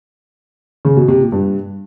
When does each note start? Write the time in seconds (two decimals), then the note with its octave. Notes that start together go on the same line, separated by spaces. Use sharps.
0.85 C#3
0.97 B2
1.08 C3
1.20 A#2
1.32 G2